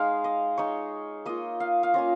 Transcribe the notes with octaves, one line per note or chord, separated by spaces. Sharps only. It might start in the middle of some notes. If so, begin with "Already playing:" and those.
Already playing: G#3 D#4 F5
D#5
G#3 D#4 C#5
A#3 F4 D#5
F5
F5
A#3 C#4 F4 D#5